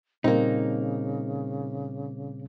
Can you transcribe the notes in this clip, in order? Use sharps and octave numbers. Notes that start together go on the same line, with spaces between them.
A#2 C#3 G3 A#3 C4 D#4